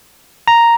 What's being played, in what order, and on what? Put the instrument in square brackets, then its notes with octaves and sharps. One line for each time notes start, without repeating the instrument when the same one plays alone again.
[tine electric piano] A#5